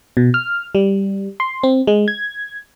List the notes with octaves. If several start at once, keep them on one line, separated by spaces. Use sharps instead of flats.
B2
F6
G3
C6
C4
G#3
G#6